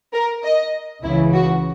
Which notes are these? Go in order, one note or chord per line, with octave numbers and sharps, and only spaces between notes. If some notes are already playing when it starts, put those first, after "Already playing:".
A#4
D#5
C#2 C#3 E3 E4
F#4